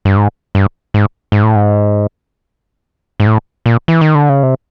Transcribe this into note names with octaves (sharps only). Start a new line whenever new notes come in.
G2
G#2
G2
G#2
G#2
A2
G#2
G#2
A2
A#2
E3
D#3
D3
C#3
C3